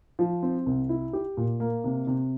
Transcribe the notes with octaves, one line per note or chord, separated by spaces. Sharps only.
F3
C4
C2
E4
G4
A#2
A#3
C3
C3